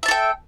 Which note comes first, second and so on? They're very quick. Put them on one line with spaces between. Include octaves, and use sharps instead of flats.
E5 A5 A4 G5